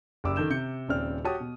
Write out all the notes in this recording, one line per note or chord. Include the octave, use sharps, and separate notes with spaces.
F#1 G4 D5 D6 E6
D#3 A4 G6 E7
C3 G6 C#7
D#1 C#3 C4 D5 F6
F#4 G4 C#5 A5 D#6
B2